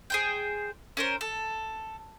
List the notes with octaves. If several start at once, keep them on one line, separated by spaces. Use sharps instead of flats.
G#4 C5 G5
C#4 A#4 C5
A4